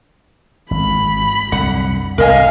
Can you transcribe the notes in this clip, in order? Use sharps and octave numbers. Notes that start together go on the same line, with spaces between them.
G#1 B5
C2 F#2 D3 F#5
C2 G#2 D#3 A#4 D#5 F5 G#5